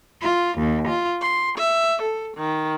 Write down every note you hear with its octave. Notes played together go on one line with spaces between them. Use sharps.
F4
D#2
F4
C6
E5
A4
D#3